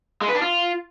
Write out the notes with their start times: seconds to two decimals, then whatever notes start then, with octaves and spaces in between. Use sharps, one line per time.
0.21 G#3
0.28 B4
0.35 D4
0.42 F4